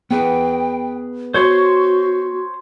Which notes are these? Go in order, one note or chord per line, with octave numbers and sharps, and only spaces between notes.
B3 G#4 B4 G5
F#4 C5 C#5 C6